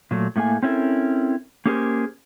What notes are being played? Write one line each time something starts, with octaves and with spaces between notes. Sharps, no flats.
A#2 F#3 A3
A2 A3 A#3 G#4 G#5
C4 C#4 E4 A4 A#4
A#3 C#4 G4 G#4 A#4 C5